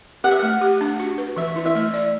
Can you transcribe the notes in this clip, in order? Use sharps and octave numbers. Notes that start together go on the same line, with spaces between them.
G4 F#5
E5
A3 F#5
G4
D4
F#4
B4
E3 E5
E4
E5
A3
D5